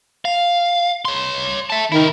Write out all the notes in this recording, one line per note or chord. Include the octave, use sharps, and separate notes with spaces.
F5
C#5 C6
E5 A5
D#3 E4 A#4